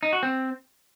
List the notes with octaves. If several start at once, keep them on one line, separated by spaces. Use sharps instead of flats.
D#4
F#4
C4